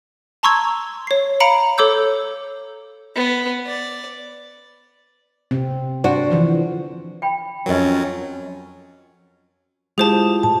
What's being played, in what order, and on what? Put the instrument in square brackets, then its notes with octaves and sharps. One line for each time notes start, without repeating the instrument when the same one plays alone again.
[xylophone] A5 A#5 C6 C#6 E6 G#6
C#5 C7
F5 A#5 B5 C#7 D7 F#7
A4 C#5 D6 E6 G6
[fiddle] B3
D5
[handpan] C3 C4
[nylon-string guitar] D4 F#4 [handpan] C5
[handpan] D3 E3 F3
[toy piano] G5 B5
[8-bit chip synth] F2 F#3 [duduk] C#4 [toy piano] A#4 D#5
[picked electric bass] G#3 [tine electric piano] E4 F4 G4 [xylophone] G#4 C5 A5
[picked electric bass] A2 [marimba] A5